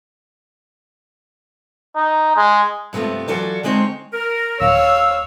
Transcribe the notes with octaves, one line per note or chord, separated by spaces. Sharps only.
D#4
G#3
G2 C3 F3 A3 B3
E3 F#3 F4 F#4 A4 D5
D3 G#3 C4 D#4 C#5
A#4
D#1 C#5 F5 E6